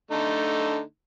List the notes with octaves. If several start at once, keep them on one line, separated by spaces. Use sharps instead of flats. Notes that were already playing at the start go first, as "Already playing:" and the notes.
D3 A3 D#4